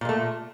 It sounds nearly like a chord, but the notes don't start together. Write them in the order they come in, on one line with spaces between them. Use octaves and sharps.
A#2 G#3 A3